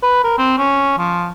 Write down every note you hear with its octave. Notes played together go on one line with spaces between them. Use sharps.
B4
A#4
C4
C#4
F3